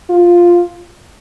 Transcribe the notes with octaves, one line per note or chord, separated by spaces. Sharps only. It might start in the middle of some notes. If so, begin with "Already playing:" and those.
F4